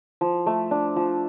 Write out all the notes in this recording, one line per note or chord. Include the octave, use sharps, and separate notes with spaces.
F3
A3
D4
F3